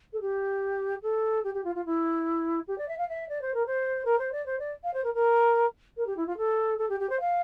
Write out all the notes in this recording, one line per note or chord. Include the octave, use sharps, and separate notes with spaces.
A4
G4
A4
G4
G4
F4
F4
E4
G4
D5
E5
F5
E5
D5
C5
A#4
C5
A#4
C5
D5
C5
D5
F5
C5
A#4
A#4
A#4
G4
E4
F4
A4
A4
G4
G4
C5
F5